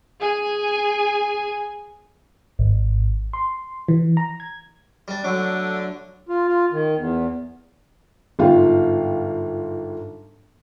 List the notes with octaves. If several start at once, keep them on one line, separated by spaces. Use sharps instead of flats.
G#4 G#5
G#1
C6
E3
A#5
G#6
G3 D4
D3 F#3 A3 D4
F4
F4
D#3
E2
G1 G#2 F4 F5 G5